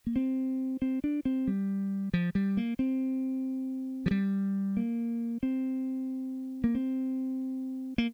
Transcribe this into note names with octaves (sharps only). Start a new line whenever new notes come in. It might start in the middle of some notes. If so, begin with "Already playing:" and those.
A#3
C4
C4
D4
C4
G3
F3
G3
A#3
C4
F3
G3
A#3
C4
A#3
C4
A#3